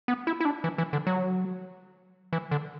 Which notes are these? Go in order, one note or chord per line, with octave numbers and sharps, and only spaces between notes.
B3
E4
E4
D4
E3
E3
D3
F#3
E3
D3